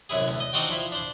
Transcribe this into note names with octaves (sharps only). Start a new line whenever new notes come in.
C2 F#2 E4 G#4
D2
D#5
C4 D4 D#4 F4 F#4 G5
F3 E4
D4 C5